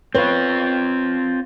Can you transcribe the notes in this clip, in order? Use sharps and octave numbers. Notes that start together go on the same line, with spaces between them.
C4 F4 B4 C#5